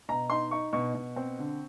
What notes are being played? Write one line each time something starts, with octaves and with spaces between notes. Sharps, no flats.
B2 A#5
D#4 C6
D#4 C#6
B2 C#6
B2
C4
D3